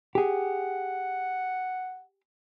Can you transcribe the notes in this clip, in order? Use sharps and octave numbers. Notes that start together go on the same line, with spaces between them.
G4 G#4 F#5